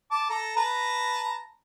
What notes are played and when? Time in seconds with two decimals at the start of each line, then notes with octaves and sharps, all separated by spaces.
0.11 A5 D6
0.30 A4 A#5
0.57 B4 A5 A#5